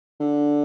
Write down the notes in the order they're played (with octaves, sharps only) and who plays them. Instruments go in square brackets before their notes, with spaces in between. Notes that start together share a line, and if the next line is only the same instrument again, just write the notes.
[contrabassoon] D3